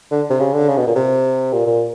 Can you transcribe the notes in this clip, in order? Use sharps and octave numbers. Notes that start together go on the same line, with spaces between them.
D3
C3
C#3
D3
C#3
B2
A#2
C3
A#2
A#2